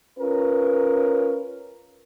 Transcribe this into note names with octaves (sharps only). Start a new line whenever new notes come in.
C#4 F4 A#4 B4